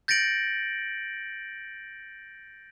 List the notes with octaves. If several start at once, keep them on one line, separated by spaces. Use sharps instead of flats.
G6 A6 A#6 C#7 D7 F#7